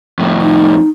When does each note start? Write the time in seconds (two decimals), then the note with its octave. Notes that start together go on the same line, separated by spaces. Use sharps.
0.19 F2 A2
0.42 D#4